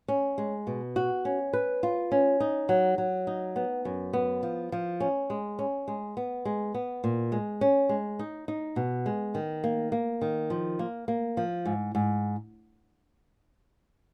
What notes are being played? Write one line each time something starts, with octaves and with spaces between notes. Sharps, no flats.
C#4
G#3
B2
F#4
C#4
B4
F4
C#4
D#4
F#3
F#3
D#4
B3
F#2
B3
F3
F3
C#4
G#3
C#4
G#3
B3
G#3
B3
A#2
G#3
C#4
G#3
D#4
D#4
B2
G#3
D#3
A#3
A#3
D#3
F3
A#3
A#3
F3
G#2
G#2